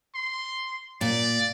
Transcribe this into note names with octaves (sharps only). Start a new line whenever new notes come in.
C6
A#2 D5